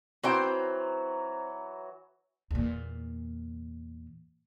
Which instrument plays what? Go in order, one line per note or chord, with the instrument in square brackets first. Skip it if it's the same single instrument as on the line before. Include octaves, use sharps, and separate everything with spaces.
[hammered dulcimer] E3 F#3 [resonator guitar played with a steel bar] C4 C5 G5
[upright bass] E2 A#2